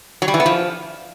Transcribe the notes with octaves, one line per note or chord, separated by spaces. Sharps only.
F#3
G3
E3
B3
F3